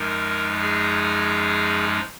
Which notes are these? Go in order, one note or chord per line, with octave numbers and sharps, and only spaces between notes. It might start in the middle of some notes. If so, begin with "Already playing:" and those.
Already playing: F#2 F3 G#3 D#4 A#4
G#4